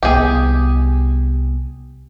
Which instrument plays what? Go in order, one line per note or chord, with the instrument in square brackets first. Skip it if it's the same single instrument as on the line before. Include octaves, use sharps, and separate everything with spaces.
[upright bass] C2 B3 [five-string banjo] G4 G#4